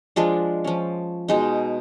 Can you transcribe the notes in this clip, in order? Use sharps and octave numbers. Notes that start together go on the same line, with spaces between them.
F3 G#3 D4 F4
F3 C#4
B2 G#3 D#4